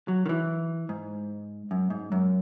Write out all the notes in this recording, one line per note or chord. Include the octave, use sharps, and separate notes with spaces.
F#3
D#3
E3
G#2
F#2
G#2
F#2